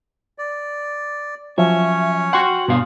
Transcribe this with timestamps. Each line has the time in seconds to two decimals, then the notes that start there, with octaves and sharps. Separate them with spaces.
0.38 D5
1.58 F3 F#3 C#4 C#5 E5
2.33 F#4 F#5 G5 C6
2.68 G2 B2 B3 F5